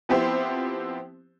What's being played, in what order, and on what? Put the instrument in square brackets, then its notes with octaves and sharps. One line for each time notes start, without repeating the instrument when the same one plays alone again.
[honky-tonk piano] F3 B3 C4 E4 G4 C5